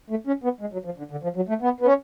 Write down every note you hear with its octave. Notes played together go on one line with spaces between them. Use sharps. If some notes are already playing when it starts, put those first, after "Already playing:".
A3
C#4
B3
G#3
F#3
F3
D3
D3
F3
F#3
A3
B3
B3
C#4